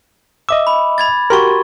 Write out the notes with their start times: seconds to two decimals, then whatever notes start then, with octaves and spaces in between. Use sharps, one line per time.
0.49 D#5 E5 D6 E6
0.67 B5
0.98 B5 G#6 A6
1.30 F#4 G4 A#4 C6 C#6